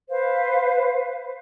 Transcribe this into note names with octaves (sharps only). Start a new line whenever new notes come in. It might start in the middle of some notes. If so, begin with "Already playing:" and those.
B4 C5 F5